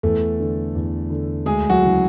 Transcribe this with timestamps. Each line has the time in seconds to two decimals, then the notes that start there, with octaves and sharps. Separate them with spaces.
0.03 E2 A3 A4
0.40 D3
0.75 E2
1.10 D3
1.46 D2 G#3 G#4
1.70 F#3 F#4
1.82 C#3 E3